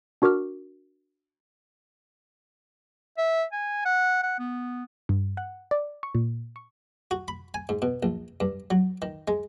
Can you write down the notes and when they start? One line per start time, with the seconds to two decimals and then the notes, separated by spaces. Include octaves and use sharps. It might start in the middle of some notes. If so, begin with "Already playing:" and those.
0.22 D4 F#4 A#4 D6 F6
3.18 E5
3.53 G#5
3.85 F#5
4.23 F#5
4.39 B3
5.09 G2
5.37 F#5
5.71 D5
6.03 C#6
6.15 A#2
6.56 C#6
7.11 F#4
7.28 B5
7.54 G#5
7.69 G#2
7.82 B2
8.03 A#1
8.40 G2
8.70 F#3
9.02 D#3
9.28 G#3